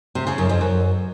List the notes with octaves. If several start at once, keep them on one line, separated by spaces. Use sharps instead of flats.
C3
C#3
F#2
F2
F#2